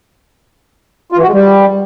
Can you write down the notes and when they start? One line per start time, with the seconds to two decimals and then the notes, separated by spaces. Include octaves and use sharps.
1.12 F4
1.17 E3
1.23 F#4
1.28 G#3
1.33 G3